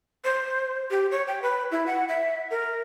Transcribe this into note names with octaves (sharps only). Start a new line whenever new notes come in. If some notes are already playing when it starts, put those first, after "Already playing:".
C5
G4
C#5
G5
B4
E4
F#5
E5
A#4